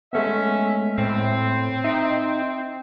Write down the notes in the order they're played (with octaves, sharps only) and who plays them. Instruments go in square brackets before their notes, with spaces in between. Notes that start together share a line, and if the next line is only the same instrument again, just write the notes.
[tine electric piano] G#3 A3 B3 [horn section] C#4 E5
[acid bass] A2 [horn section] C4
[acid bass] D#4 [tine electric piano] E5